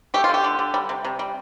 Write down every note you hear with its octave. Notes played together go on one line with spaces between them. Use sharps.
A3 G4
F4
D3
G4
D3
D3
G3
C3
C3
G3